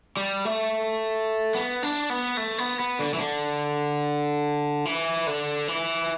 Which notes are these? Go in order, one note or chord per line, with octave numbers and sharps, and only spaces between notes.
G3
A3
B3
D4
B3
A3
B3
B3
D3
E3
D3
E3
D3
E3